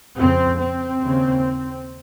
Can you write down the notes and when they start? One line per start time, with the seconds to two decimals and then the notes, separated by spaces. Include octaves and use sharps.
0.16 F2 C#3 C4
0.58 C4
1.01 D#2 C#3